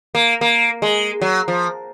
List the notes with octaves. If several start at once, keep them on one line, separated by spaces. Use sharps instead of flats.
A#3
A#3
G#3
F#3
F3